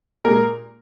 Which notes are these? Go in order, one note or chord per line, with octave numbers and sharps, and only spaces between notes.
A#2 G#3 A#3 A#4